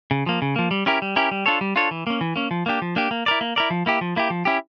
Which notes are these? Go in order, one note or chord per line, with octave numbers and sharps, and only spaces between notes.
C#3
F3 A#3
C#3
F3 A#3
G3
C#4 E4 G4 A#4
G3
C#4 E4 G4 A#4
G3
D4 F4 A4 C#5
G3
D4 F4 A4 C#5
E3
A#3 C#4
E3
A#3 C#4
F3
A#3 D4 G4
F3
A#3 D4 G4
A#3
E4 A#4 D5
A#3
E4 A#4 D5
F3
A#3 E4 G4
F3
A#3 E4 G4
F3
C#4 E4 G4